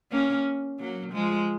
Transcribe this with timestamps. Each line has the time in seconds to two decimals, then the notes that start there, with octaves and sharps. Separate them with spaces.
0.12 A#3 C#4
0.79 F#3 A#3
1.13 F3 G#3